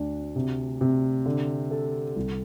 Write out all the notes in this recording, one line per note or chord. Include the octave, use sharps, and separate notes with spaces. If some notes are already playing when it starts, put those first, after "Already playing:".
Already playing: D2 D4
C3
C3
D3
A4
C2